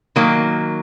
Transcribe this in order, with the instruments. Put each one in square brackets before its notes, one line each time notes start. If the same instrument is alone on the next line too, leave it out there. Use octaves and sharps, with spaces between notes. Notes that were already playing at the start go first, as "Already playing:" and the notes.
[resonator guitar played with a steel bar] D#3 F#3 A#3